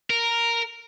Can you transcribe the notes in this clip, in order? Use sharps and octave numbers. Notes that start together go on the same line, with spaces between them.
A#4